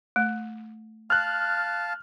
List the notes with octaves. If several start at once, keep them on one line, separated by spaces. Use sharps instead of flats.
A3
F5 A5 F6 F#6